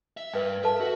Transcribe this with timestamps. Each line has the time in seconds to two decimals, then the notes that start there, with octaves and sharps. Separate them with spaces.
0.17 E5
0.33 G2 B4 G5
0.64 A4 B4 E5 A5
0.80 F#4